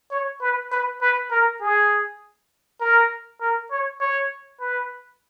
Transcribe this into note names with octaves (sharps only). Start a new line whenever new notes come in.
C#5
B4
B4
B4
A#4
G#4
A#4
A#4
C#5
C#5
B4